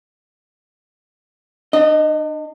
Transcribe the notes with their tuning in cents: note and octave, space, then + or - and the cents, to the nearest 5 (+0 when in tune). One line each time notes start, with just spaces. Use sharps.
D4 +40 D#5 -5